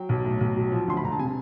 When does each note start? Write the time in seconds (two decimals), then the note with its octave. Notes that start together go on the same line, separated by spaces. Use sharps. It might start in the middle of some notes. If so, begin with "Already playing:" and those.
Already playing: F#3 G5
0.09 B1
0.25 A2
0.41 B1
0.56 F#3
0.72 F3
0.88 D2 C6
0.97 B5
1.03 E1 A#5
1.12 A5
1.19 C3 G#5